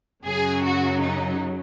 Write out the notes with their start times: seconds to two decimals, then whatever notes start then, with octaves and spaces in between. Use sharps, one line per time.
0.25 F#2 C#3 F#3 G#4
0.63 F#4
1.00 D#4